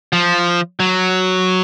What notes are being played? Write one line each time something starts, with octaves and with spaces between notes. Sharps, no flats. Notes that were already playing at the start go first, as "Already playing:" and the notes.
F3
F#3